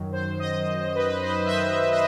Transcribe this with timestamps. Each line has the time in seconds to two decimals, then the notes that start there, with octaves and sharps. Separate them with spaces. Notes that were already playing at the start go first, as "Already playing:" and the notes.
Already playing: F#2 D#3 F#3
0.12 C5
0.39 D#5
0.95 B4
1.23 C5
1.45 E5
1.50 D#5
1.92 D#5